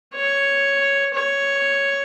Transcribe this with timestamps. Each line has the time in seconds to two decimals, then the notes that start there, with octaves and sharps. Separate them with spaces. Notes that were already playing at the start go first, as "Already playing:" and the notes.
0.15 C#5
1.14 C#5